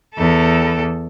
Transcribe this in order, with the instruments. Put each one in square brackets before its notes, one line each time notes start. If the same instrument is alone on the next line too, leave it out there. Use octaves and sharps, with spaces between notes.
[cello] E2 A4